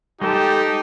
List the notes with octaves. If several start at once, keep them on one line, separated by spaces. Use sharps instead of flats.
G#3 D#4 G4 A4 A5